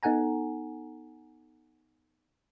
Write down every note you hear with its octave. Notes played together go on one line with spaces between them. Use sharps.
B3 D#4 A4 F#5 G#5 A#5